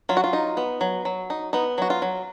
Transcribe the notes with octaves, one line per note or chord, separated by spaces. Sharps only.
F#3 F4
F#4
F4
D#4
B3
F#3
F#3
D#4
B3 D#4
F#3 F#4
F4
F#3